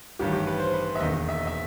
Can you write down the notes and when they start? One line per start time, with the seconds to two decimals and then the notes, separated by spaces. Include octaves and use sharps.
0.19 A1 G2 D#3 G4
0.33 G4
0.47 B4
0.60 C5
0.73 B4
0.86 C5
0.95 E5
0.99 E1 D#2 D#3 D#5
1.29 E5
1.38 D#5
1.47 E5